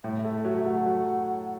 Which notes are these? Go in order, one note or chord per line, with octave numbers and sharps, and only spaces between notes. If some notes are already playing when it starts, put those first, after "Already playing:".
A2 E5
A3 E5
F#3 E5
A3 F#5
F#3